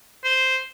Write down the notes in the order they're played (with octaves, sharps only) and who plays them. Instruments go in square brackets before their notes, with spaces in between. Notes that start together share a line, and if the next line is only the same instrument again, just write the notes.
[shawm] C5